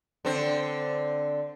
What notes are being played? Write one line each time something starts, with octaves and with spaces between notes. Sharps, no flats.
D3 C4